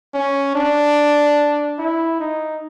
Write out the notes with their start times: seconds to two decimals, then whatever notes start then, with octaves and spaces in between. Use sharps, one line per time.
0.14 C#4
0.55 D4
1.79 E4
2.20 D#4